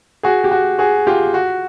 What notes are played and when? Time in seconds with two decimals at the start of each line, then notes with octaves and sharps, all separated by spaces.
0.23 F#4 G#4
0.44 G4
0.51 F#4
0.79 F#4 G#4
1.07 F4 G4
1.34 F#4